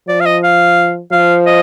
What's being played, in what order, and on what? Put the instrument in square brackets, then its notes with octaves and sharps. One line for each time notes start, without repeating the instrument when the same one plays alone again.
[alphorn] F3 [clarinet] D5
[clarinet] F5
D#5
F5
[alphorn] F3 [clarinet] F5
[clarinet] D#5